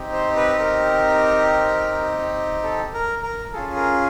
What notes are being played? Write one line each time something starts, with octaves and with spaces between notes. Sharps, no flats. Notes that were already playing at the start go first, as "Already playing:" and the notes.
Already playing: C4 D#4 G4
C5
B4
A#4
A4
A#4
A#4
C#4 F4 G#4 A4
A#4